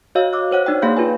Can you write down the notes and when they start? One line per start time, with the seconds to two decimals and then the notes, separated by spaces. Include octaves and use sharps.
0.15 F#4 C#5 D#5 F5 E6
0.33 D6 E6 F#6
0.51 C5 C#5 F#5 F#6
0.66 D4 D#4 D5 G5
0.82 A#3 G#4 F5 B5 G6
0.97 F4 B4 G#5